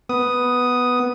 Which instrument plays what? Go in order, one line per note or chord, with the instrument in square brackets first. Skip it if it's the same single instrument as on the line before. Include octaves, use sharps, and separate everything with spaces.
[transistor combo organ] B3 D#6